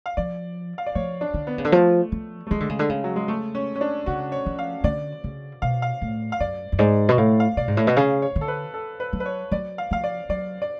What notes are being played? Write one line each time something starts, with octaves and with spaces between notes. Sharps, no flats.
F5
F3 D5
F5
D5
F3 C#5
D4
D3
B3
C#3
D3
F3 A3
F3
A3
F3 G#3
D3
C#3
D3
C#3
F#3
G#3
A3
C#4
C#4
D4
C#3 F#4
C#5
F3
F5
D3 D5
C#3
B2 F5
F5
A2
F5
F#2 D5
F#2
G#2 D5
B2
A2 F5
F5
B2 D5
G#2
A2
B2
C#3 F5
C#5
D3
A4
B4
A4
B4
F#3
B4
C#5
F#3 D5
F5
F3 F5
D5
F#3 D5
D5